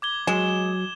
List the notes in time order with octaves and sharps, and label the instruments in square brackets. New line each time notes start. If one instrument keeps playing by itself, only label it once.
[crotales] D6 G#6 G7
[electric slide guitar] F#3 [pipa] G#3 [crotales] E7